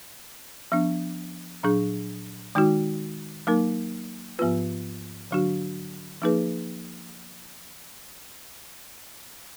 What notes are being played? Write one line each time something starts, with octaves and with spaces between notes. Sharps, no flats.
F3 B3 D4
A#2 F#3 D4 G#4
D#3 G#3 D#4 F#4
F#3 A#3 D#4 A#4
G#2 F3 B3 F4 B4
D3 F#3 D4 F#4
F3 A#3 D#4 G#4 B4